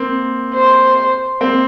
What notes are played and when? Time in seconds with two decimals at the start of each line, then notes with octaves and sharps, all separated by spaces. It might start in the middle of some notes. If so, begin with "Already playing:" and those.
Already playing: A#3 C4
0.55 C5
1.41 A#3 C4